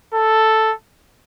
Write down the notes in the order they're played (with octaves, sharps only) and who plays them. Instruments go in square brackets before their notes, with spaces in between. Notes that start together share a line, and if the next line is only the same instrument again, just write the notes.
[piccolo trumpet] A4